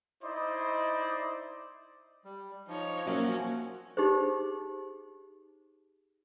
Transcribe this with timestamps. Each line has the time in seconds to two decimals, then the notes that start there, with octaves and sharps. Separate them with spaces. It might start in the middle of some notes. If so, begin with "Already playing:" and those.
0.24 D#4 E4 C5 D5 D#5
2.25 G3
2.68 F3 D#4 C#5
3.06 F#3 A#3 C#4 F#4
3.97 D#4 G4 G#4 C5